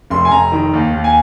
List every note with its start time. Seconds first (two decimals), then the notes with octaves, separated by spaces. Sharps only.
0.10 F1 C6
0.25 G#5
0.31 F1 A#5
0.52 D#3
0.73 D#2
0.94 D#2
1.04 G#5